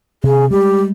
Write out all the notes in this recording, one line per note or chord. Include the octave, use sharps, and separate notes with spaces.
C3 G#4
G3 G#3 G4